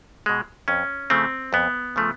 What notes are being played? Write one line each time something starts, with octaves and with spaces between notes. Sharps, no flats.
B2 G#3
F2 C#4
C#3 F3 A3 C4
F2 B3
C#3 F3 A3